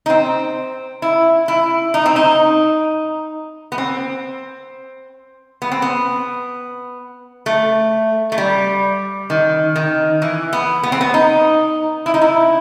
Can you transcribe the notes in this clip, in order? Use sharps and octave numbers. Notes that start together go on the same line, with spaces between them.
D#4
C4
E4
E4
D#4
C4
D#4
B3
C4
B3
C4
B3
A3
A3
G3
D#3
D#3
E3
B3
B3
C4
B3
D#4
E4
D#4
E4